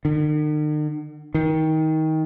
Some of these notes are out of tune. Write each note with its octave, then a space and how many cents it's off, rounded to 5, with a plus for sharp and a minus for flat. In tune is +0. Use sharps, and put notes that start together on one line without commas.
D#3 -45
D#3 +20